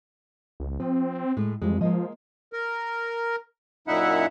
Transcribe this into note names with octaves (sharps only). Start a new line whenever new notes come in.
C#2
F3 C4
A2 G#3 A3
F2 E3 G3 G#3
F3 G#3 A#3 D#5
A#4
F#2 A#2 D#4 E4 E5 F#5